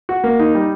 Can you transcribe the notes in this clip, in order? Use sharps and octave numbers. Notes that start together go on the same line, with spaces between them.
F#4
A#3
D#4
G3